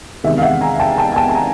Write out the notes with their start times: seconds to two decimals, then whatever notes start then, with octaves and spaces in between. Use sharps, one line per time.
0.24 E2 C3 D#3 G#3 E5
0.38 F5
0.42 E5 F#5
0.61 G#5 A#5
0.80 G5 A5
0.98 G5 A5
1.12 G#5
1.16 G5 A5
1.29 A5
1.35 G#5 A#5